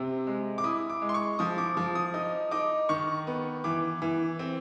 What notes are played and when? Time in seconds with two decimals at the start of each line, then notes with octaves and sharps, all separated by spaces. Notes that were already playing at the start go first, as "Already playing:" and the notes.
Already playing: C3 C4
0.27 G#3
0.58 D6
0.64 E4 D#6
0.90 D6
1.02 G#3
1.09 C6
1.14 C#6
1.39 F3 D#6
1.58 D6
1.77 F3 D6
1.95 D#6
2.14 D#4 D#6
2.51 D#4 D6
2.89 D#3 C#6
3.27 B3
3.64 E3 D6
4.02 E3
4.39 C4